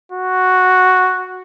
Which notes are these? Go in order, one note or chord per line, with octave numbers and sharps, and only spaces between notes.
F#4